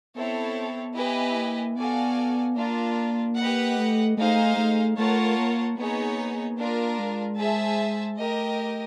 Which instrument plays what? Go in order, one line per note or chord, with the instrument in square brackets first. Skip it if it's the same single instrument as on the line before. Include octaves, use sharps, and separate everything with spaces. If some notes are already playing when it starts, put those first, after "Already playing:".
[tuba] B3 [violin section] C4 E4 A4 C#5
[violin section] E4 G4 B4 D#5 G#5
[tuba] A#3
[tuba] B3 [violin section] F#4 A4 D5 F5 G#5
[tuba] A#3 [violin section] D4 F4 A#4
[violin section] G4 B4 D#5 F#5
[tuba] A3
[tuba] A3 [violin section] D#4 G#4 C5 F5
[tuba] A3
[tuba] A3 [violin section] F4 A#4 C#5 F#5 A5
[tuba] A#3
[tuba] A#3 [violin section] B3 D#4 G#4 C#5
[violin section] D4 F4 A#4
[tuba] G#3
[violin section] G#4 C5 E5 A5
[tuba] A3 [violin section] G4 A#4 D#5